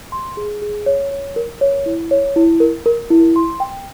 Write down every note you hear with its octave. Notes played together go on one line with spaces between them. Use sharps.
C6
G#4
G#4
C#5
C#5
A#4
C#5
E4
C#5
E4
A#4
A#4
E4
C6
G5